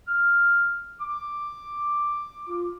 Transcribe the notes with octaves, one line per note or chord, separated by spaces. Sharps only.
F6
D6
F4